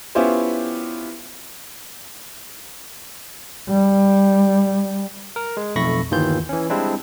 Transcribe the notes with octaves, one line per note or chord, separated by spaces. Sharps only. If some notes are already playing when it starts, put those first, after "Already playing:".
B3 C#4 E4 F4 G4 C5
G3
A#4
G#3
B1 F2 A3 B5 C#6 A#6
G1 D#2 D#3 E3 F4 G6
E3 C#4
G3 G#3 C4 D4 E4